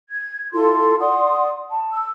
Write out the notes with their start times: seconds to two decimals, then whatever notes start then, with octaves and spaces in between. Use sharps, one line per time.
0.10 G#6
0.53 E4 F4 A4 C6
0.99 D5 F#5 C6 D#6
1.70 A5
1.91 E6